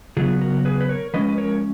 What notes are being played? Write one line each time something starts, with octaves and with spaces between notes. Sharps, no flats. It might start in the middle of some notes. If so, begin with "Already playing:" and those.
C#3 F#3 B3 F4 G#4
F#4 A#4
G#4 B4
B4
A#4 C#5
F3 G#3 C#4 B4 D#5
B4
A#4 C#5